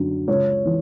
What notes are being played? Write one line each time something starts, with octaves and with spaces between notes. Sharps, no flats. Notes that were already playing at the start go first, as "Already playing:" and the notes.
Already playing: F#2 D3 F#3
C#2 C#5
E3